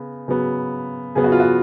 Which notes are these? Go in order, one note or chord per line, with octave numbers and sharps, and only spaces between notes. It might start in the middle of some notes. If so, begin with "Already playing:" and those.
Already playing: C#3 B3
C#3 F#3 B3
C#3 F#3 B3 G#4
F#4
F4
F#4